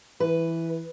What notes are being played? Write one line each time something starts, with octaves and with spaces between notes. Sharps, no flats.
E3 B4